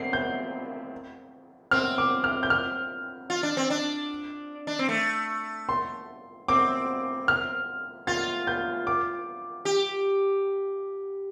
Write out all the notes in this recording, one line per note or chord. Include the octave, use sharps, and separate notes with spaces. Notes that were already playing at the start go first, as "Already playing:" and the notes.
Already playing: C4 C7
G6
C4 F6
D6
F6
G6
F6
F4
D4
C4
D4
D4
C4
A3
C6
C4 D6
F6
F4 A6
G6
D6
G4